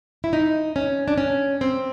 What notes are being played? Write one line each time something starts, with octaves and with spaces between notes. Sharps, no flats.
E4
D#4
C#4
D4
C#4
C4